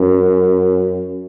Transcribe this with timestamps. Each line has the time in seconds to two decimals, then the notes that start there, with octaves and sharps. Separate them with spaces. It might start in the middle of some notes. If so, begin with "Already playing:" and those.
Already playing: F#2